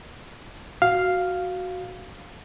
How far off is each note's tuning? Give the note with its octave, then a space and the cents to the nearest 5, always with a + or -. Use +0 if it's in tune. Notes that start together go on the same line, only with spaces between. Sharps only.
F#4 +0 F5 +0